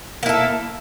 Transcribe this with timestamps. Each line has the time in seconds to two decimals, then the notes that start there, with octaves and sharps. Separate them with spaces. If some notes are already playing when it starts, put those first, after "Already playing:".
0.23 A#3
0.26 E4
0.29 A4